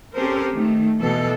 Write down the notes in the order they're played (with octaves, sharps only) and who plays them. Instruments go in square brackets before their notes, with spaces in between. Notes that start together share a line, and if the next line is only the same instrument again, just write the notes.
[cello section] C4 C#4 G4 A4 A#4 C5
D#3 A3
B2 E3 A4